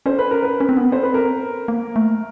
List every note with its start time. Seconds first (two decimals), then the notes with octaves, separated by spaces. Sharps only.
0.06 C#4 C5
0.19 B4
0.31 A#4
0.43 B4
0.60 C#4
0.69 C4
0.77 B3
0.86 C4
0.92 C5
1.03 B4
1.14 A#4
1.68 A#3
1.96 A3